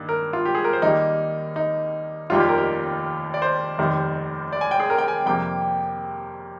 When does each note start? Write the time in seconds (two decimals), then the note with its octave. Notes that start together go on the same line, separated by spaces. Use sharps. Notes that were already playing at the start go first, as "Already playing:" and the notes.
Already playing: G2 D#3 A#3
0.09 A#4
0.33 F4
0.45 G4
0.55 G#4
0.64 A#4
0.73 C5
0.82 D#2 D#3 G3 A#3 D#4
1.56 D#4
2.30 F1 D#2 D#3 G3 A#3 F4
2.40 G4
2.49 A#4
2.58 G4
3.34 D5
3.42 C5
3.78 F1 D#2 D#3 G3
4.52 D5
4.61 G#5
4.71 G5
4.80 G#4
4.90 A#4
4.98 G5
5.08 G#5
5.26 F2 C3 G3 A#3 G5